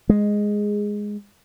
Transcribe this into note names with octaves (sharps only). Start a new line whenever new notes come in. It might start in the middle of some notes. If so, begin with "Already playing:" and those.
G#3